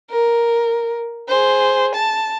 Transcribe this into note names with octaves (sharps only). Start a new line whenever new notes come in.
A#4
G#4 C5
A5